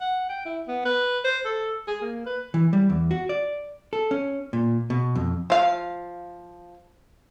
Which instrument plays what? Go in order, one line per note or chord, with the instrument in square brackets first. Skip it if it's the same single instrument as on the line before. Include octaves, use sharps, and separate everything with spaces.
[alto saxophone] F#5
G5
E4
B3
B4
C5
A4
G#4
A#3
B4
[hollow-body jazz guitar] E3
G3
E2
F#4
D5
A4
C#4
A#2
B2
F2
[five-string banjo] F3 F5